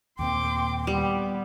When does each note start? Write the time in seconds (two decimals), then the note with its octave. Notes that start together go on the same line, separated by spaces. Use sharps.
0.19 D#2 A#2 C4 G5 C6 D6
0.87 G3 B3